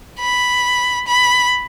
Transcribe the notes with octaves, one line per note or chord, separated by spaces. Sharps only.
B5
B5